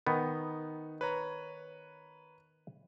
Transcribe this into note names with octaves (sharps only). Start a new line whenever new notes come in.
D#3 B3 D#4
B4 C#5 A#5